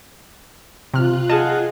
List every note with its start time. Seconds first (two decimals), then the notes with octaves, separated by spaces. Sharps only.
0.94 C3 F4 F6 F#6
1.30 G#4 D#5 F5 F#5 A5